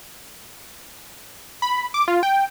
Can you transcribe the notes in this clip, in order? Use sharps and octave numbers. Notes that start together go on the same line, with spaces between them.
B5
D6
F4
G5